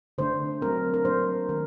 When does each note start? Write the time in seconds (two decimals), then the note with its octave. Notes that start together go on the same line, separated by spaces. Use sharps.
0.18 D3 A3 D4 C5
0.62 F#3 A3 C4 A#4
0.94 A#4
1.05 F#3 A#3 D4 C5
1.49 D#3 A3 D4 A#4